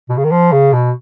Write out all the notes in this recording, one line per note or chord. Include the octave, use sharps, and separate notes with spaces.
B2
C#3
D#3
F3
C#3
B2